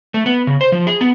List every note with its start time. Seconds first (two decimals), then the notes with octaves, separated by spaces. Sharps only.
0.14 A3
0.26 B3
0.47 C#3
0.61 C5
0.72 F3
0.87 G#4
1.01 B3